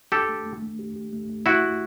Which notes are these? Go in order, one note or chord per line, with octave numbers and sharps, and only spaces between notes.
D4 G4 A4
A3
A3
A3
G4
G4
A3
A3
A3 E4 F#4
A3